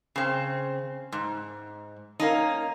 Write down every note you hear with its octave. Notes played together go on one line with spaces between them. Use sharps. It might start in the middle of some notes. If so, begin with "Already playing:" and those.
C#3 C4
G#2
A#3 C#4 D#4